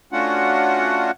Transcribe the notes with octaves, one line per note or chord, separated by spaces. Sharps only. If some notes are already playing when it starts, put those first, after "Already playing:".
A3 C#4 D4 F4 F#4 F#5